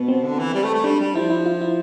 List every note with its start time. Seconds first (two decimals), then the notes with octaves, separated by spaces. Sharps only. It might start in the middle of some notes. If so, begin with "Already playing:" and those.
Already playing: B2 B3
0.08 C4
0.24 D3
0.39 E3
0.54 G3
0.64 A3
0.74 A3
0.84 G3 D4
1.00 G3
1.14 F3 E4
1.30 E4
1.46 F4
1.61 E4